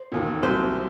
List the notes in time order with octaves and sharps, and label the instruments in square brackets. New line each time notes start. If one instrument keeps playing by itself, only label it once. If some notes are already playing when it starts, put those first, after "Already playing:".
Already playing: [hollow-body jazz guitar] C5
[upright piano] E1 D#2 D#3
[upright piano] C2 C3 F#3 [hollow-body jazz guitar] C5